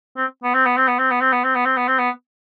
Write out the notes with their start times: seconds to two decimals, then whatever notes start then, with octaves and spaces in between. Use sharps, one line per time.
0.17 C4
0.44 B3
0.54 C4
0.66 B3
0.77 C4
0.88 B3
0.99 C4
1.11 B3
1.21 C4
1.32 B3
1.44 C4
1.55 B3
1.65 C4
1.77 B3
1.88 C4
1.98 B3